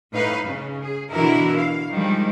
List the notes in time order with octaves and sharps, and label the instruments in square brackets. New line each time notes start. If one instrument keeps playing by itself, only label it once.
[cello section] A2 D#4 B4 F5
C#3
G#4
B2 D3 E3 E4 F#4 A#4
F5
D#3 F3 G3 G#3